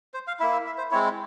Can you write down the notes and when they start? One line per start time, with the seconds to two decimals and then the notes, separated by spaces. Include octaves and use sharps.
0.14 C5
0.27 F5
0.40 A#3 E4 E5
0.52 E5
0.66 E5
0.78 C5
0.91 G#3 C4 E4 C#5